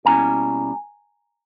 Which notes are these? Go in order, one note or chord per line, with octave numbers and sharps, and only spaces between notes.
B2 G3 A#3 C#4 E4 G#5 A#5